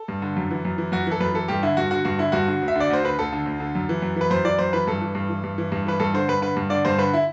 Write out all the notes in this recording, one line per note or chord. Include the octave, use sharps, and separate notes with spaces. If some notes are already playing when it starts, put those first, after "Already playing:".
Already playing: A4
G2
D3
F#2
E3
F#2
E3
F#2 F#4
E3 A4
F#2 B4
E3 A4
G2 G4
D3 E4
G2 F#4
D3 F#4
G2 F#4
D3 E4
G2 F#4
D3
D2
E5
D3 D5
D2 C5
D3 B4
D2 A4
D3
D2
D3
F#2
E3
F#2
E3 B4
F#2 C5
E3 D5
F#2 C5
E3 B4
G2 A4
E3
G2
E3
G2
E3
G2
E3 B4
G2 A4
D3 C5
G2 B4
D3 B4
G2
D3 D5
G2 C5
D3 B4
E4